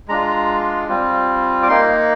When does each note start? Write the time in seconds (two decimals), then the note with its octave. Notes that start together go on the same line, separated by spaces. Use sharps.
0.08 G#3 D4 F4 A#5
0.88 G3 C4 F4
1.63 D6
1.69 A#3 D#4 C6